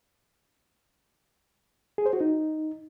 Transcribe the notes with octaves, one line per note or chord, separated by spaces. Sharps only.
G#4
C5
F#4
D#4